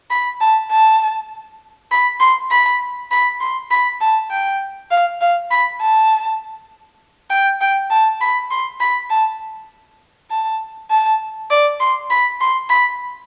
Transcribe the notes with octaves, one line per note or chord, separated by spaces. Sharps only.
B5
A5
A5
B5
C6
B5
B5
C6
B5
A5
G5
F5
F5
B5
A5
G5
G5
A5
B5
C6
B5
A5
A5
A5
D5
C6
B5
C6
B5